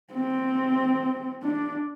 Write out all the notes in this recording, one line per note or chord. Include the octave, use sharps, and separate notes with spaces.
C4
D4